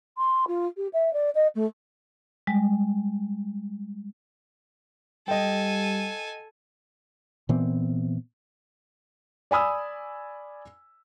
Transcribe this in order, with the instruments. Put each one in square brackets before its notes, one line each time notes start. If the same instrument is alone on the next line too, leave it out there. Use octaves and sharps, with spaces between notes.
[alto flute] C6
F4
G4
E5
D5
D#5
A3
[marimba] G3 G#3
[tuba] G3 [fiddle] A4 G#5 [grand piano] D#5 G5
[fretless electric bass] A#2 E3 B3 C4
[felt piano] D5 G#5 B5 D#6 E6